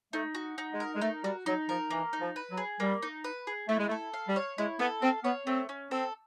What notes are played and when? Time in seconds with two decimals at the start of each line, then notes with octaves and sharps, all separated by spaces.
0.13 A3 D#4
0.35 F#4
0.58 D#4
0.72 G#3
0.80 A#4
0.95 G#3
1.01 A3 D#4
1.24 G3 F#4
1.46 F#3 D#4
1.69 F3 A#4
1.91 E3 A#3
2.13 D#4
2.21 F3
2.36 B4
2.51 F#3
2.57 G#4
2.80 G3 A#3
3.02 D#4
3.24 B4
3.47 G#4
3.69 A3 E4
3.78 G#3
3.88 A3
3.91 A4
4.13 F5
4.28 G3
4.36 C#5
4.58 G#3 E4
4.79 B3 A4
5.02 C4 F5
5.24 B3 C#5
5.47 A3 C4
5.69 C#4
5.91 C4 A4